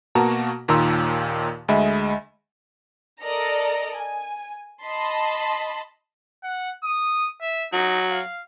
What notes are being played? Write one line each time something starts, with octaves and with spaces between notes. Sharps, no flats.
B2 A#3 F#4 A5 A#5
D#2 A#2 D#3 A#5 C6 E6
D2 G#3 D#5 E5 B5
A4 A#4 D5 D#5 A#5
G#5
D#5 A5 B5 C6
F#5
D#6
E5
F#3 D#4
F5